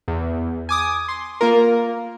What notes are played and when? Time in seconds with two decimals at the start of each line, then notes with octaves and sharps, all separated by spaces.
0.08 E2
0.69 G#5 D6 D#6
1.08 C6
1.41 A#3 F4 A#4